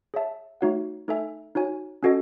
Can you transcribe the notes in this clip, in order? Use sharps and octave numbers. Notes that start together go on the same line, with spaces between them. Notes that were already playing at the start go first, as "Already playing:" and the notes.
G#4 C#5 E5 A5
A3 D#4 F#4 C#5 F#5
A3 D#4 A4 E5 G#5
D#4 F#4 C#5 G#5
C#4 F#4 A4 D#5